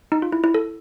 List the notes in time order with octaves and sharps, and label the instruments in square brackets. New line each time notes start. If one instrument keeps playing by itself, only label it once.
[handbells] D#4
F4
E4
E4
A4